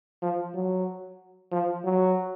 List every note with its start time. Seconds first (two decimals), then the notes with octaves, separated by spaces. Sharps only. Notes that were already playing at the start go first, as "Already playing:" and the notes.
0.22 F3
0.54 F#3
1.52 F3
1.84 F#3